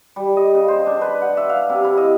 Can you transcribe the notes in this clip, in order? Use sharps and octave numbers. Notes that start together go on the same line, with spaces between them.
G3
D#5
C#3
C5
D4
B4
F#5
E5
F5
C3
E4
D#5